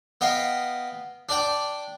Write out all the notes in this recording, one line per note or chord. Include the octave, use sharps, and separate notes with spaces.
B3 D#5 F5 G5
D4 D5 G5